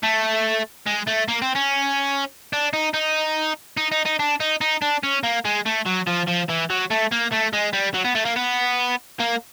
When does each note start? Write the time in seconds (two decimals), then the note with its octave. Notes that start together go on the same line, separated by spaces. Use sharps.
0.03 A3
0.86 G#3
1.07 A3
1.28 A#3
1.42 C4
1.56 C#4
2.53 D4
2.73 D#4
2.94 D#4
3.77 D#4
3.92 D#4
4.06 D#4
4.19 D4
4.40 D#4
4.61 D#4
4.82 D4
5.03 C#4
5.23 A#3
5.45 G#3
5.66 A3
5.86 F#3
6.07 F3
6.27 F3
6.49 E3
6.70 F#3
6.90 A3
7.11 A#3
7.32 A3
7.53 G#3
7.73 G3
7.94 F#3
8.05 B3
8.15 A3
8.25 A#3
8.36 B3
9.20 A#3